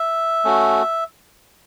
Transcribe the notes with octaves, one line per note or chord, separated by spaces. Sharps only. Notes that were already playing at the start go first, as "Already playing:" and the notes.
Already playing: E5
A3 C#4 F#4